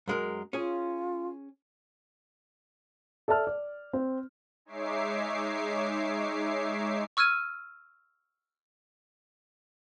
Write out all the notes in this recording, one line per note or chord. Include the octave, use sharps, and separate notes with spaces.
F#2 G#3 A#4
C#4 F4 G#4
A4 D5 E5 A5 F6
D5
C4
G#3 D#4 C#5 E5 D6 C7
C#6 E6 F6 G#6 D#7